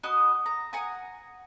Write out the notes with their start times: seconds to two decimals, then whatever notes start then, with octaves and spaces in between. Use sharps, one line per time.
0.03 F#4 B4 D#5 D#6
0.46 A#5
0.73 F#5 G#5 A#5 D#6